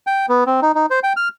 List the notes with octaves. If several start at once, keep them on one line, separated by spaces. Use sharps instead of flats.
G5
B3
C4
D#4
D#4
C5
G5
F6